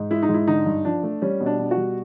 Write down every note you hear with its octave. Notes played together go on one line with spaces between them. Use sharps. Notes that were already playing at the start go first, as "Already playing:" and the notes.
Already playing: G#2
G#3 E4
D#4
G#2 E4
D3 D#4
G2
F3 D4
A3
G3 C#4
B2
D4
B2
F#4
G3